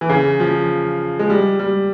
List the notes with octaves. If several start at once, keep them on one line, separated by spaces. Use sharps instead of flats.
E3
C#3
F3
G#3
G3
G3